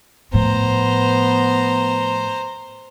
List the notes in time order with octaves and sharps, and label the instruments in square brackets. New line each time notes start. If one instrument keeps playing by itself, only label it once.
[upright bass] A2 F3 [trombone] B3 [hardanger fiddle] C5 A#5